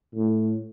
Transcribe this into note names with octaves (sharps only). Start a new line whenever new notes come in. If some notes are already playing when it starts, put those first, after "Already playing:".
A2